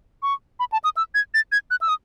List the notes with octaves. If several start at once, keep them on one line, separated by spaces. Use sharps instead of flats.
C#6
B5
A5
D#6
E6
G#6
A6
G#6
F#6
E6
D#6